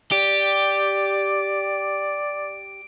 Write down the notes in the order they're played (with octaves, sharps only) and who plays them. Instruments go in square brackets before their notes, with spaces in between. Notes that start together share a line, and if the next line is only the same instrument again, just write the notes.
[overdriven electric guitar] G4 [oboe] D5 [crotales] D7